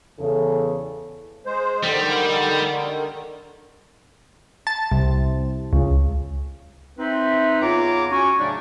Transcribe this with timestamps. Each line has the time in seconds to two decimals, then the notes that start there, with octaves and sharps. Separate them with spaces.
0.20 E2 C#3 A4
1.46 G#3 C5
1.83 D3 D#3 G3
4.67 A5
4.92 C2
5.73 C#2
6.98 C4 D#4 B4 E5
7.62 E2 C#3 F4 C#5 A#5 D6
8.11 C#4 F#4 G#5 C#6
8.38 A2 C#3 F#3 A3 D4